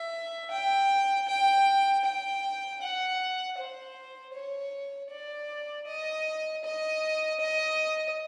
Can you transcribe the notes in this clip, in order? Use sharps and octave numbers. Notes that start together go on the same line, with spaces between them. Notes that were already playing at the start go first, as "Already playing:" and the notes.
Already playing: E5
G5
G5
G5
F#5
C5
C#5
D5
D#5
D#5
D#5